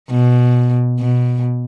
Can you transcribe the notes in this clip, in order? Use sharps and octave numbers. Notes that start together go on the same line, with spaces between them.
B2
B2